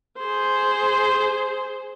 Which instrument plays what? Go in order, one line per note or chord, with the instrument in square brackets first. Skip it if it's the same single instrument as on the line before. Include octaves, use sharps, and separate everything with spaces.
[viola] G#4 C5